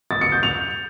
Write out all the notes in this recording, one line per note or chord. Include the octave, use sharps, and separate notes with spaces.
A6
C#7
G6
F7